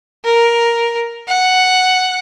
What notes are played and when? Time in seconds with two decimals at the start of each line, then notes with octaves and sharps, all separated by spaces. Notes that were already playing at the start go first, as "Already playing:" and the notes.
0.24 A#4
1.28 F#5